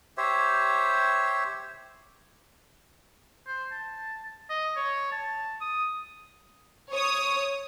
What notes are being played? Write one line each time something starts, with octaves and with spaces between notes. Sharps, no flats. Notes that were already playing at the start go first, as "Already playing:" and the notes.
G4 C5 C#5 E5
C5
A5
D#5
C#5
A5
D#6
C#5 D#6